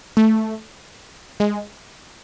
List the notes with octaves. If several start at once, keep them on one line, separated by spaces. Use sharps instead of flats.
A3
G#3